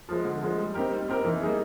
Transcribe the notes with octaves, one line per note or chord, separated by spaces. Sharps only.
F3 G#3
D3
F3 G#3
G3
C4 D#4 G4 A#4
G3
C4 D#4 G4 A#4
E3
G3 A#3 D#4 G#4